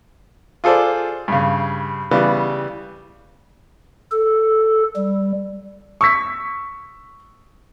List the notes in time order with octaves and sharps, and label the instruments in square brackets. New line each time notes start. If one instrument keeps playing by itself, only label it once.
[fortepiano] F4 G#4 A4 C5 D5
G2 C#3
C#3 E3 G3 B3
[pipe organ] A4
G3
[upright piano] C#6 E6 B6